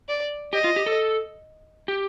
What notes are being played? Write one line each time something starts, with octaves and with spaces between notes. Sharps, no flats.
D5
G4 D#5
F4
G4
A4
G4